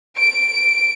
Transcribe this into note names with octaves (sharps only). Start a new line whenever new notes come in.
D7